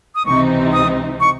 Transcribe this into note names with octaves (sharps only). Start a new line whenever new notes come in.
D#6
C#2 C3 E3 C4 D#4 C#6
D#6
C#6